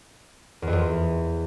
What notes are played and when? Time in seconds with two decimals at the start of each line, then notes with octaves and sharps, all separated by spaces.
0.62 E2
0.67 F2
0.73 E2